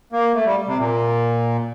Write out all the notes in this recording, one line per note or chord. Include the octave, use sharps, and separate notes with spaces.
A#3
A3
G3
C3
A#2